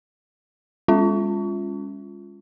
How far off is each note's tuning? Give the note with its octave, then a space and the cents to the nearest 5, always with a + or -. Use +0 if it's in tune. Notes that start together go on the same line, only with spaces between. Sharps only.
G#3 -40 C#4 +0 F4 +0